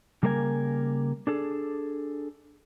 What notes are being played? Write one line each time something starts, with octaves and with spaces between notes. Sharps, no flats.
C#3 G3 A#3 A#4 C5 G#5
D4 G#4 A4